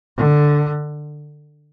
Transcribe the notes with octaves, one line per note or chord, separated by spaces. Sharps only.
D3